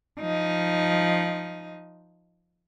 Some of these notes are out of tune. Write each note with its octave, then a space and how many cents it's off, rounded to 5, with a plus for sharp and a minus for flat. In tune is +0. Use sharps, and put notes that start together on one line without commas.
F3 +0 D#4 +0